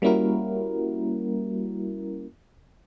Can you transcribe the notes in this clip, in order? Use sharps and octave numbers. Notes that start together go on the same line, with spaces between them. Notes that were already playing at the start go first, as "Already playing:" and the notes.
G3 A#3 C#4 E4 F#4 A#4